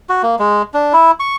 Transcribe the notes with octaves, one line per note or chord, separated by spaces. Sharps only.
F#4
A#3
G#3
D4
E4
C#6